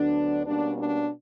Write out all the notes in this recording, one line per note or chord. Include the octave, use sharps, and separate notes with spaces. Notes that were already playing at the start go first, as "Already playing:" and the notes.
Already playing: D2 D3 F#3 B3 D4
B2 G3 A#3 C#4 D4
D4